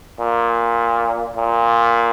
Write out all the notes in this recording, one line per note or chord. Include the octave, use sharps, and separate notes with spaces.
A#2
A#2